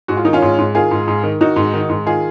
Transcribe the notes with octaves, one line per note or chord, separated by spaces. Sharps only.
G#2 F#4
F4
D#3 D#4
C#4 F4
G#2
G#2
D#3 F4 G#4
G#2
G#2
D#3
D#3 D#4 F#4
G#2
D#3
G#2
D#3 F4 G#4